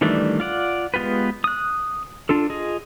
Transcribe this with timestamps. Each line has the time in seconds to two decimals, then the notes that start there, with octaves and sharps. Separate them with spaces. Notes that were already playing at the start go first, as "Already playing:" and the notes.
0.01 D#3 E3 G3 A3 D4
0.40 F4 D5 F#5
0.94 G#3 B3 F4 G4 B4
1.44 D#6 F#6
2.29 D4 F4 A4
2.50 F4 G#4 D#5